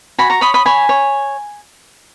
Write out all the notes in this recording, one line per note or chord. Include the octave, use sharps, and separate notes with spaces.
F#4 G#5 B5
A#5 C#6
C#5 B5 D#6
B5 D#6
C#5 G#5 B5
C#5